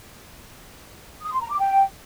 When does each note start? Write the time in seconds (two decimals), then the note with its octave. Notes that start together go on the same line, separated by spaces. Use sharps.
1.23 D#6
1.32 C6
1.41 A#5
1.51 D6
1.60 G5